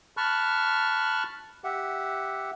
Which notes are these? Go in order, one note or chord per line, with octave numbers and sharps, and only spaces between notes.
A5 B5 C#6 F6 F#6
G4 E5 F#5